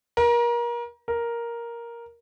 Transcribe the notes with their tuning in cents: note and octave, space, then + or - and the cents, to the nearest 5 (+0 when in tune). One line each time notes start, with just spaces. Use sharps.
A#4 +30
A#4 +5